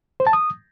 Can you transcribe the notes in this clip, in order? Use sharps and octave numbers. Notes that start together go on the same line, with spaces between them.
C5
A5
D#6